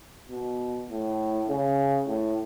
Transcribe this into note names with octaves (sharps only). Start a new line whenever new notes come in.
B2
A2
C#3
A2